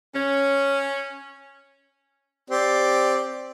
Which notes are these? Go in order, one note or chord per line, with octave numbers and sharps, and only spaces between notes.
C#4
C4 G4 D5